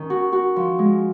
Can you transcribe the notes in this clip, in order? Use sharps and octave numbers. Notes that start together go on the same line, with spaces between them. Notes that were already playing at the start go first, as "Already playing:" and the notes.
Already playing: D#3 C#4
F#4
F#4
F3
G#3